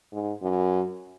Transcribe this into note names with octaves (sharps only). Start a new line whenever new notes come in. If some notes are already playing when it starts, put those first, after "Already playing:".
G#2
F#2